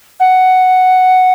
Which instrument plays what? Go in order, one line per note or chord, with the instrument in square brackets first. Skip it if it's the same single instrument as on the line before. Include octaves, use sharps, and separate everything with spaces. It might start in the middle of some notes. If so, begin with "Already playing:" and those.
[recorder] F#5